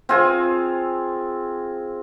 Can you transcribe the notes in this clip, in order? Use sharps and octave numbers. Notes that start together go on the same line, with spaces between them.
C4 F4 G#4